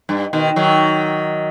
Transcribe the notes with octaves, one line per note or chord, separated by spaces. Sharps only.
G2
B2 D#3
D#3 F#3